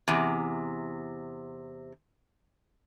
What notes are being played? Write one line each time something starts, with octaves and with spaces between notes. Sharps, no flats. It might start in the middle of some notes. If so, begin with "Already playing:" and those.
E2 C3